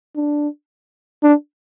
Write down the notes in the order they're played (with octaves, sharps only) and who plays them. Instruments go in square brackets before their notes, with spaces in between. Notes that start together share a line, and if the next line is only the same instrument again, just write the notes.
[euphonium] D4
D4